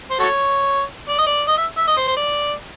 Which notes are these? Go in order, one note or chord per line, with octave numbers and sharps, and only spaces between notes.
C5
F#4 A4 C#5
D5
D#5
D5
D#5
E5
E5
D#5
C5
C5
D5